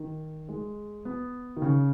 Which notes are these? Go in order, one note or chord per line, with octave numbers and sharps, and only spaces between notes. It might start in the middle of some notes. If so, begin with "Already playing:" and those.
Already playing: D#3
G#3
B3
D#3
C#3